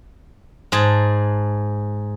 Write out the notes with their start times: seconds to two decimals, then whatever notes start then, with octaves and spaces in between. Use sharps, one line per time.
0.72 G#2 G#4 A5